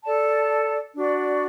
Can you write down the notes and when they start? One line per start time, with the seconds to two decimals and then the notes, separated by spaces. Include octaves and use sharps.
0.04 A4 D5 A5
0.95 D4 F#4 D5